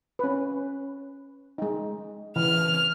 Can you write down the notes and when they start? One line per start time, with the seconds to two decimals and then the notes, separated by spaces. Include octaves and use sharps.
0.19 C#4 B4
1.58 G#3 D#4
2.36 C#3 E3 F6